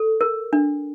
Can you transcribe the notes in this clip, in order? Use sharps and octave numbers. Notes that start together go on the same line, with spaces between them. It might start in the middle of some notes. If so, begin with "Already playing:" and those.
Already playing: A4
A#4
D4